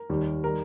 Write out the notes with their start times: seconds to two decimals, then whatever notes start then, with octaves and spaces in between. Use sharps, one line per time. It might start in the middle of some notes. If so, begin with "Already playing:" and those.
Already playing: A#4
0.09 D#2 D#3 G3
0.44 D#3 G3 A#4